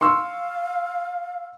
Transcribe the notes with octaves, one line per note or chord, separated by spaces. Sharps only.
F5 C6 C#6 E6